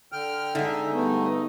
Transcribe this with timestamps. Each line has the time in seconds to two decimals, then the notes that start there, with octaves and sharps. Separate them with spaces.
0.12 D3 G5 F6
0.55 D3 G#3 D#4 E5
0.93 G2 A3 B3